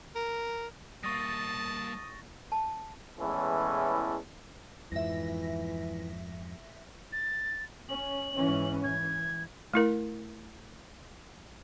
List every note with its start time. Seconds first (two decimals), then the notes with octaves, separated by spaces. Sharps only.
0.15 A#4
1.03 G3 A#3 A5 C#6 D#6 A6 A#6
2.52 A5
3.19 E2 A2 E3 G#3 C#4 A4
4.92 F2 G#2 E3 F3 E5 A#6
7.12 A6
7.89 C#4 F#7
8.34 G#2 E3 C#4
8.84 E3 G#6
9.74 A3 E4 A#4